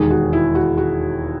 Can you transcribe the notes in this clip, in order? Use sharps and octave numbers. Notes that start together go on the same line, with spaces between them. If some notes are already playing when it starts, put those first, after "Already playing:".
Already playing: E1 D#2 D#3 G#4
F#4
E4
F#4
F#4